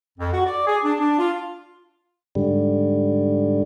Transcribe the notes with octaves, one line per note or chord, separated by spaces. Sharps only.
F2
F#4
D5
G#4
D4
D4
F4
G#2 D3 G3